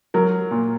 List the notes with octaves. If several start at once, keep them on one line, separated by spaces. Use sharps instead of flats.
F#3 A#4
A#2